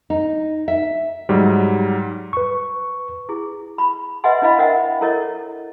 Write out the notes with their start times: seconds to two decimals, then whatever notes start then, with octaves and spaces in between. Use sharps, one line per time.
0.10 D#4
0.68 E5
1.29 G#2 F#3 G3
2.33 B4 C#6
3.29 E4 G#4
3.78 B5
4.24 B4 D#5 E5 F#5 G#5 C6
4.42 D4 E4 D#5 F5 B5
4.58 A#4 C5 D#5 E5 F#5 G5
5.01 E4 A4 A#4 C#5 D#5